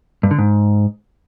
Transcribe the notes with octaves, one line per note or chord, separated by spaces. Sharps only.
G2
D3
G#2